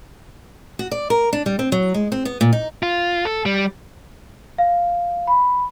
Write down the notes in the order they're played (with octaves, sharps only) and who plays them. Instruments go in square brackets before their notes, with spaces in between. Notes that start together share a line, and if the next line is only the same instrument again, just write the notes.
[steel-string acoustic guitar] F#4
D5
A#4
D4
G3
C4
F#3
G#3
C4
B3
A#2
D#4
[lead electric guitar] F4
A4
G3
[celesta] F5
B5